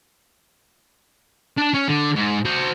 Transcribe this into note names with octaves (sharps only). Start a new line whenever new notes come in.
D4 A5
C#4
D3
G#2
F#4 C5